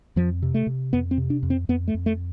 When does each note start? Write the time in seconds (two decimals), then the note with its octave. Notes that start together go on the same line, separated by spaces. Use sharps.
0.16 F2 F3
0.42 C3
0.54 A3
0.67 C3
0.93 F2 B3
1.11 C4
1.18 C3
1.30 D4
1.43 F2
1.50 C4
1.69 F2 B3
1.88 A3
1.94 F2
2.06 A3